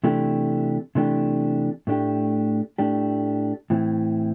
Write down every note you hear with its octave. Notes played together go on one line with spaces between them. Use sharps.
C3 E3 A3 D4 G4
C3 E3 A3 D4 G4
A2 A3 D4 G4
A2 A3 D4 G4
A2 E3 C4 E4